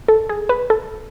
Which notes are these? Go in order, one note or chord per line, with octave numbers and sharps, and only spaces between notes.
A4
G#4
B4
A4